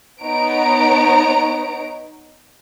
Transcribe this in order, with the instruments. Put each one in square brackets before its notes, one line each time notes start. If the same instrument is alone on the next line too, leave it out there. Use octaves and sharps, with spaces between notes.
[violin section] B3 D#4 C#5 A#5 D7